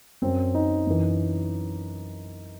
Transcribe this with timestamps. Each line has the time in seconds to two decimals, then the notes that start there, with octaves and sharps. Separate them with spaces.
0.22 F#2 F#3 C4
0.54 D#4
0.87 F#2 E3